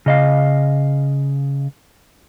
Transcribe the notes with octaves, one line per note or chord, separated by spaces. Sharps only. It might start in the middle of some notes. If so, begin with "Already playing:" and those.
C#3 D#5 F5